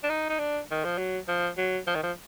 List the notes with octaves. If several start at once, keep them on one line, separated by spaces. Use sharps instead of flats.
D4
D#4
D#4
D4
D#3
F3
F#3
F3
F#3
F3
D#3
F3